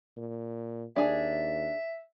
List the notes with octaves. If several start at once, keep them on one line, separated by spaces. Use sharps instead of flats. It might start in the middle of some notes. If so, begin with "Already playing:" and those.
A#2
D#2 D4 G#4 E5